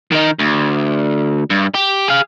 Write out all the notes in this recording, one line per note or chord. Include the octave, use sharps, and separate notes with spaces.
D#3 D#4
D2
G2
G4
G#4 F5